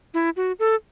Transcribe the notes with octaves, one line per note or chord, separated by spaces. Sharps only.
E4
F#4
A4